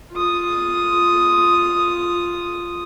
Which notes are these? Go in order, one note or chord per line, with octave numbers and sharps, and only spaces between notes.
F4 D#6